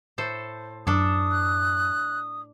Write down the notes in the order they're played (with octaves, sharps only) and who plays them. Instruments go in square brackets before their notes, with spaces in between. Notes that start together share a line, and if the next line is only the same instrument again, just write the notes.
[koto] A2 A4 C5
[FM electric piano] F#2 [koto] D4 A4 [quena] D#6
[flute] F#6